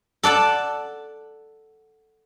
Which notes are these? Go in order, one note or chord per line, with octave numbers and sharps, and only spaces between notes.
A4 D5 F#5 A5